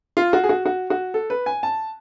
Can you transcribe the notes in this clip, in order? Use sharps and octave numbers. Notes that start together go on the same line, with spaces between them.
F4
F#4
G#4
F#4
F#4
F#4
A4
B4
G#5
A5